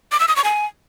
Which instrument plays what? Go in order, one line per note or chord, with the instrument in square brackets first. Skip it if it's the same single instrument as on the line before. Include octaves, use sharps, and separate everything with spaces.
[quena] D6
E6
D#6
C#6
G#5